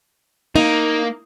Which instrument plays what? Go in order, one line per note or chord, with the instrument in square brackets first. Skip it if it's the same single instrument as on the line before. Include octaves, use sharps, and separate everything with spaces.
[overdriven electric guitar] A#3 [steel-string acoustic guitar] D#4